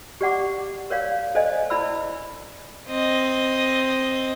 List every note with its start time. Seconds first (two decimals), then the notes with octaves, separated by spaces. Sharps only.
0.21 G4 D5 F#5 D6
0.90 A#4 C#5 D5 F5
1.35 A4 C5 D5 D#5 G#5
1.70 E4 D5 B5 E6
2.89 C4 D#5